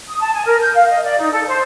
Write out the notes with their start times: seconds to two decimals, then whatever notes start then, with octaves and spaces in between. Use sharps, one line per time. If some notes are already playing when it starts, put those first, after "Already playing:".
0.09 D#6
0.21 A5
0.34 G#5
0.46 A#4
0.61 G6
0.75 F5
0.88 D#5
1.03 D5
1.19 D#4
1.32 A4
1.48 C5